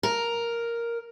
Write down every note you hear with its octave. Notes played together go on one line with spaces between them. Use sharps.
A#4